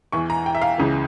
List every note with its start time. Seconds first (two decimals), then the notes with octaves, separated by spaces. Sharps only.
0.12 E2 E3 C#6
0.30 A#5
0.46 G5
0.55 E5
0.62 F5
0.78 C#2 C#3 E3